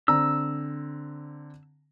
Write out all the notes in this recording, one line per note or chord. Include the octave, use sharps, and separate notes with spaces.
D3 C4 A#5 E6